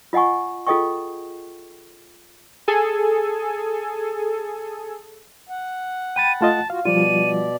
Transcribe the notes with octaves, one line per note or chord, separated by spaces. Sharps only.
F4 D#5 F#5 G#5 C#6
F4 G#4 A4 D#5 G5 C#6
G#4 A4 G#5
F#5
G5 B5 A6 D#7
A3 F4 D#5 A5
F4 F#4 F5
B2 F3 G3 F4 D5 D#7